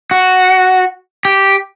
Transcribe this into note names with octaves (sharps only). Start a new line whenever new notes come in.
F#4
G4